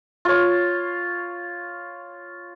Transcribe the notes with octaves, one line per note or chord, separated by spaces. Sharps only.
F4 C#5